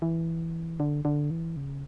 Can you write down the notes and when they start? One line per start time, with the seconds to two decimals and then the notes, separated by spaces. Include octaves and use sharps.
0.02 E3
0.80 D3
1.05 D3
1.31 E3
1.56 C#3